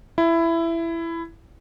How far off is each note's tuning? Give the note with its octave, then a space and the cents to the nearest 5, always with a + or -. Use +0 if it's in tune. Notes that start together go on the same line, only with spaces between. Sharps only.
E4 +15